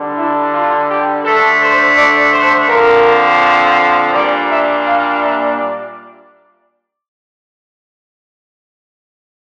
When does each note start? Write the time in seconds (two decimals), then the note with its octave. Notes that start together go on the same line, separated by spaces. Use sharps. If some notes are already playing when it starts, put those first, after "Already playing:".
Already playing: D3 G3 D4
0.16 E4
0.52 F4
0.89 G4
1.24 D3 A3 D4 A4
1.60 C5
1.96 D5
2.32 C5
2.68 D3 F3 C4 A#4
4.12 A#2 G3 A#3 D4 D5
4.48 E5
4.84 F5
5.20 E5
5.56 D5